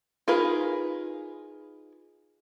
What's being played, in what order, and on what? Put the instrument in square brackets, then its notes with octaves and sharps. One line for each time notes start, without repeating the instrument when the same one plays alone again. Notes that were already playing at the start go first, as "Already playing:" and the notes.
[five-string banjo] D#4 F4 G#4 A#4 B4